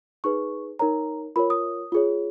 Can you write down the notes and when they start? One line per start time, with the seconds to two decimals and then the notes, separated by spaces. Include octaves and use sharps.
0.24 D#4 G#4 B4 C#6
0.79 D#4 A#4 C#5 A#5
1.36 F4 A#4 C#5 B5
1.50 D#6
1.92 F4 G#4 C#5